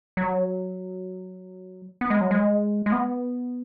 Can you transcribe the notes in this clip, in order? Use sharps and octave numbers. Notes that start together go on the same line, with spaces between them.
F#3
B3
G#3
F#3
G#3
G#3
B3